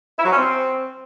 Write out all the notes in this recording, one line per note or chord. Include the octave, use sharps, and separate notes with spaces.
E4
F#3
C#4
C4